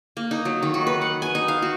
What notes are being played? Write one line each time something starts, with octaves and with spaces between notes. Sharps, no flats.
A#3
D#4
F#3
D#3
F#4
B4
F#5
G#5
D#4
F5
F#4